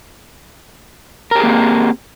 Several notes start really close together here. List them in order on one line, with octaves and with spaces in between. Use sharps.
A#4 G4 G#4 A#3 C4